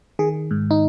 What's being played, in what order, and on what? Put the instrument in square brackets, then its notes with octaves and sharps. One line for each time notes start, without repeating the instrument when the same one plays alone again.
[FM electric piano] D#3 G#4
G#2
D#4